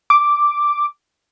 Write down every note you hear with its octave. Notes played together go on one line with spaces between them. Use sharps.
D6